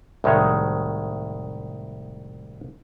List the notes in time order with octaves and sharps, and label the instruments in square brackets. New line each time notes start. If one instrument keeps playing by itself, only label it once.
[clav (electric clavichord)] C2 A2 D#3 G#3 C#5